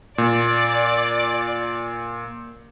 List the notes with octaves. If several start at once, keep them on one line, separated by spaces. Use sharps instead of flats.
A#2 D5